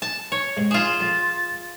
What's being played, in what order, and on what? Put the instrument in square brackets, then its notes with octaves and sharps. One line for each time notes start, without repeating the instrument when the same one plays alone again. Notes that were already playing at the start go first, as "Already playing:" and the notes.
[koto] A5
C#5
[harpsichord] G#3 C4
[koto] F4 G#4 [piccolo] E7
[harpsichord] F2 [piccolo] A6